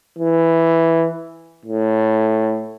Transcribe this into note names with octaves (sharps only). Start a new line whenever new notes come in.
E3
A2